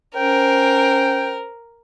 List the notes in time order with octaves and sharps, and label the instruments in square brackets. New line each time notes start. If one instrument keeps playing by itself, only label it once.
[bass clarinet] C#4 [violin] A#4 [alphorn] C5 [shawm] G5